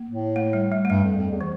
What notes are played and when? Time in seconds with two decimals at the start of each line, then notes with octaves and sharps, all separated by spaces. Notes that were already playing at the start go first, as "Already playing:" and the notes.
Already playing: A#3
0.08 A2
0.36 A3
0.53 G3
0.72 G3
0.85 A3
0.90 G2 G3
1.04 F2
1.17 F2
1.30 E2
1.41 E3